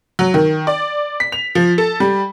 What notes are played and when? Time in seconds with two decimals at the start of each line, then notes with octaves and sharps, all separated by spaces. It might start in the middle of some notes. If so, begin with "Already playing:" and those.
0.19 F#3
0.34 D#3
0.67 D5
1.20 B6
1.32 F7
1.55 F3
1.78 A4
2.00 G3